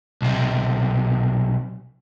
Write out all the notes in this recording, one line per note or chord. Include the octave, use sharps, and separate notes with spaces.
B1 C3